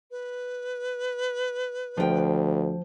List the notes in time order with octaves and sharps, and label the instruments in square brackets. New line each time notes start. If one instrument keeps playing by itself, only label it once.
[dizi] B4
[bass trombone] D2 [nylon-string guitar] F3 G5